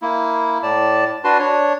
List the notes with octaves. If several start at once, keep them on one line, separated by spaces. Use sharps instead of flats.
A#3 E4
A2 D5 A5
D4 F#4 B4 A5 C6
D4 C#5